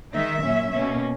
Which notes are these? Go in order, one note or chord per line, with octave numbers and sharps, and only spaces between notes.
D#3 G#3 D#4 E5
A#2 F#3 C#4
B2 A#3 C#4